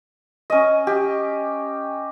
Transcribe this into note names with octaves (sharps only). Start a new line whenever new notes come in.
C#4 D#5
G4